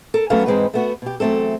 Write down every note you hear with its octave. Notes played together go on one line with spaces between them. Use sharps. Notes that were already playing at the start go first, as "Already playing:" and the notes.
A4 A#4
F#3 A3 B3 C#4 A4 F5
G#2 E3 G#3 C4 D#4 B4
A3 B3 F#4
B2 G4
E2 F#3 A3 C4 A4